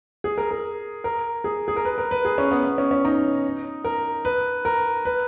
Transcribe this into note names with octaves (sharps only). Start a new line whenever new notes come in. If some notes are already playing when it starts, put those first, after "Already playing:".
G#4
A#4
A#4
A#4
G#4
G#4
A#4
B4
A#4
B4
G#4
C#4
B3
B3
C#4
C#4
D#4
A#4
B4
A#4
B4